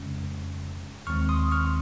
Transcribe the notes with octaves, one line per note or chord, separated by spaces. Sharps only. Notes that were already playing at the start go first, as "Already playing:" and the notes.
Already playing: F2 C#3 G#3 C#4
D#2 D#3 G#3 C4 C#6 F6
C6 D#6
C#6 F6